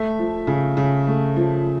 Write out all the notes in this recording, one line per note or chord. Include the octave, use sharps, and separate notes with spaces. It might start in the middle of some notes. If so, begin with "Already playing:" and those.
Already playing: A3 E5
F3
C#3
C#3
A3
F3